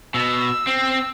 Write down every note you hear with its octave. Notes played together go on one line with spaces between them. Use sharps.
B2 E6
C4